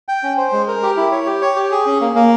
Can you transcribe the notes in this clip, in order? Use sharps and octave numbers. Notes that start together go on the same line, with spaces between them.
G5
C#4
C5
G#3
A#4
G4
E4
C#5
G4
C#5
G4
G#4
C#4
A#3
A#3